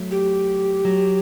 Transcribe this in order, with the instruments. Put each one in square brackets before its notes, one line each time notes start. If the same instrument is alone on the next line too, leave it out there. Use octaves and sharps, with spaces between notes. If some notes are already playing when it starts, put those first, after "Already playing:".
Already playing: [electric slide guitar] F#3 A3
[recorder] G4
[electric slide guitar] F#3